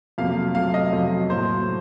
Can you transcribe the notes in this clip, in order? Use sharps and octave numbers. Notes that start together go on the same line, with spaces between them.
F2 C3 F#3 A#3 F5
C3 F#3 A3 F5
D#5
F2 C3 F#3
A2 F#3 A#3 C5